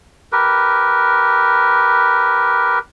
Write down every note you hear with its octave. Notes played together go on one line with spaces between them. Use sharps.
G4 A#4 B4